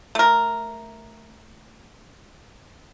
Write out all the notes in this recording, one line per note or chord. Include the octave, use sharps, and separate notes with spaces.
A3 A#4